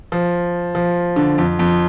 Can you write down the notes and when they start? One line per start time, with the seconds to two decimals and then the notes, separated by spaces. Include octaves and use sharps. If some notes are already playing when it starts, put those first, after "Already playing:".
0.12 F3
0.75 F3
1.16 D3
1.38 F2
1.59 F2